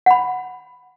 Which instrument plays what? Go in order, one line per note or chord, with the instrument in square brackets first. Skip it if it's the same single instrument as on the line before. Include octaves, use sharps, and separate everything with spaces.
[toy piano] F#5 B5